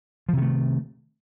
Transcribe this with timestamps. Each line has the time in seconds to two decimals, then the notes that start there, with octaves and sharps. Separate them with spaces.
0.29 F3
0.33 C3
0.37 D#3
0.42 A3